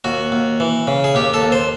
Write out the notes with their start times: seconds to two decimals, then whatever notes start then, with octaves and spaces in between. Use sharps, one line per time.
0.04 D#2 F#4
0.32 D#2
0.60 E3
0.87 C#3
1.04 G#4
1.15 D#2 G4
1.34 A4
1.42 D#2
1.52 C5